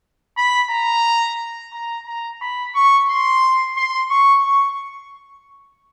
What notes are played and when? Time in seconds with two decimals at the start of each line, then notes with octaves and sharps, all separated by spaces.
0.37 B5
0.71 A#5
1.73 A#5
2.07 A#5
2.41 B5
2.75 C#6
3.09 C6
3.78 C6
4.10 C#6
4.45 C#6